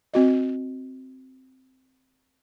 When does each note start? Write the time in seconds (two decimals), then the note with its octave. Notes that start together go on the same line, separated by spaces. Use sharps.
0.14 C4 F#4 D#5